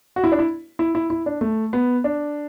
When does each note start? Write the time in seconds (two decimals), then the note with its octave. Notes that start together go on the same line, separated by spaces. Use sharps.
0.16 F#4
0.24 E4
0.32 D4
0.39 E4
0.79 E4
0.95 E4
1.10 E4
1.26 D4
1.41 A3
1.73 B3
2.04 D4